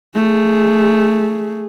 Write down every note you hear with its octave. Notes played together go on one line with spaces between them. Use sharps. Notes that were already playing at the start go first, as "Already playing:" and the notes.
A3 G#4